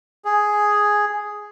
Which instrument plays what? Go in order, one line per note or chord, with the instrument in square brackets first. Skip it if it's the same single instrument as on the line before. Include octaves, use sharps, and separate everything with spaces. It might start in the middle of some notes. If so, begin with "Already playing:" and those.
[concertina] G#4